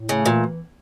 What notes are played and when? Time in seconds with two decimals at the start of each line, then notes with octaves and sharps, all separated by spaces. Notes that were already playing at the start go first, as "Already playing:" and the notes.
Already playing: A2
0.09 C#3 A3
0.25 A#2 E3